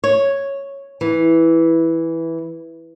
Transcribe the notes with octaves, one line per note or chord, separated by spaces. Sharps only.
C#5
E3